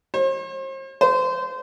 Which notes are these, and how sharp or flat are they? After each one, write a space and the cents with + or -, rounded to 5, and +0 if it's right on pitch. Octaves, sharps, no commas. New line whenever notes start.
C5 +40
C5 -30